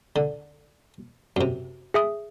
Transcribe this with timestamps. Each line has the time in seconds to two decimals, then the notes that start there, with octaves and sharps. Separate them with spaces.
0.16 D3
1.36 F#2 C3
1.94 G#4 E5 D#6